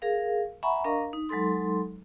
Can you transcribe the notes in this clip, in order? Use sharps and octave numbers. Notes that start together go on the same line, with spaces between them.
G#4 A#4 F5
E5 F#5 G#5 A#5 B5 C#6
D4 A#4 D#5 F5 A#5 C#6
D#4
F#3 G#3 D#4 A4 C6